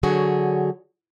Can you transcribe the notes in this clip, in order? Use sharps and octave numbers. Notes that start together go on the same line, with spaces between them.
D3 F#3 F#4 G#4 C#5